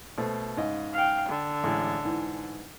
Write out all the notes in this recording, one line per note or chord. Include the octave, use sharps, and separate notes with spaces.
B2 A3 C5
G#2 C#3 D#5
F5 G5
D3
A1 A2 G#3
G#2 E3